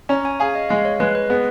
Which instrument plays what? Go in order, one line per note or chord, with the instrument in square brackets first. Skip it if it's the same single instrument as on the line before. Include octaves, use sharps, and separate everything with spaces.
[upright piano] C#4 [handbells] A#5
[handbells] G#5
[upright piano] G#4 [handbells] F5
[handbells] D#5
[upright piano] G#3 [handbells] F5
[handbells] C#5
[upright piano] G#3 [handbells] B4
[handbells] B4
[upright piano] B3 [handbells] G#4